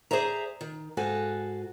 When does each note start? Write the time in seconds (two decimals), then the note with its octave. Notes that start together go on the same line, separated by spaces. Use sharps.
0.11 G#4 C5 D5 E5 A#5
0.61 D#3
0.97 G#2 F#4 A4 F5 G#5